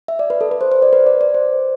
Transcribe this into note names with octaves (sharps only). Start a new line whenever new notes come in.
E5
D5
B4
A4
B4
C5
C5
D5
B4
D5
D5
C5